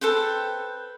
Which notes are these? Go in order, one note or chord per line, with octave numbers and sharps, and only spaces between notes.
A4 B4 C5 G5